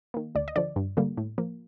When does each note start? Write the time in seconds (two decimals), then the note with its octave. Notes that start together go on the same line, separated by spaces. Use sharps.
0.14 D#3 A#3
0.35 D2 D5
0.48 D#5
0.56 D3 F3 D5
0.76 G2
0.97 D3 G3 A#3
1.17 A2
1.38 F3 A#3